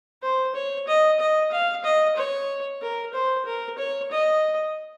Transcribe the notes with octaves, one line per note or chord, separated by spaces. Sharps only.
C5
C#5
D#5
D#5
F5
D#5
C#5
A#4
C5
A#4
C#5
D#5